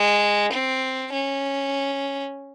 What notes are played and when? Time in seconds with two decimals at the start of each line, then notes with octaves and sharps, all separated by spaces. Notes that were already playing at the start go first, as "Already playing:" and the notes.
Already playing: G#3
0.52 C4
1.12 C#4